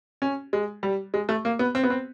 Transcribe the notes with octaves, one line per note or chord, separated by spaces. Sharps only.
C#4
G#3
G3
G#3
A3
A#3
B3
C4
B3
C4